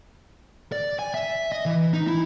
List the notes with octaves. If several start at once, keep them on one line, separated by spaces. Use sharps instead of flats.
D5
G#5
E5
D#5
E3
D#4
E4